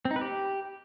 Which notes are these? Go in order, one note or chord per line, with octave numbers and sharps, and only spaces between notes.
C4
D#4
B4
G4